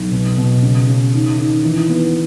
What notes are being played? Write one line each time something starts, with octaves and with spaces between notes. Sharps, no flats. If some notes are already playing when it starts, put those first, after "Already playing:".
Already playing: B1
B2
B2
C#3
C#3
D#3
D#3
E3
B3